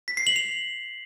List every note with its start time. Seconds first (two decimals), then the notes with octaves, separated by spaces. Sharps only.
0.08 B6
0.17 C7
0.27 F#7
0.36 F7